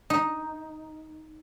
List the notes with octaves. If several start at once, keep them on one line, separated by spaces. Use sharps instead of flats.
D#4